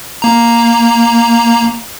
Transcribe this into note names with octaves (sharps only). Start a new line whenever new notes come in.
A#3 A#5